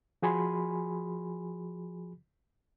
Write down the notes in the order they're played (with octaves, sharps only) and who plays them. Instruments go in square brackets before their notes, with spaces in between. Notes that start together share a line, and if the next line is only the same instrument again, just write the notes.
[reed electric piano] F3 F#4 G#4 G#5 B5 C6